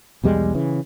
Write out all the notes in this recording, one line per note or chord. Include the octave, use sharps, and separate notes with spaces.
B1 E2 G3 G#3
C#3 E3